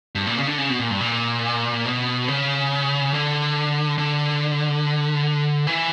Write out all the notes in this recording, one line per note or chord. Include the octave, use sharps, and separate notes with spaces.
G2
A#2
C#3
D3
C#3
B2
A#2
G2
A#2
B2
C#3
D3
D3
E3